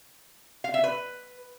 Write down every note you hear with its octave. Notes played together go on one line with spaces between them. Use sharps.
F5
E5
B4